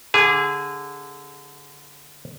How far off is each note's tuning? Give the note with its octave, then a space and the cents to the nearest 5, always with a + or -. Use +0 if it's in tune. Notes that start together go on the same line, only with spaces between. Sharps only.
D3 -10 G#4 -25 G#5 +20